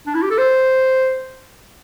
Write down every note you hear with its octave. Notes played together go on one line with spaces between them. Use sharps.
D4
E4
G4
A4
C5